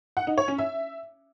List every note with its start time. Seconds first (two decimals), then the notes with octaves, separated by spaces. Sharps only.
0.17 F#5
0.27 D#4
0.38 C#5
0.48 C#4
0.58 E5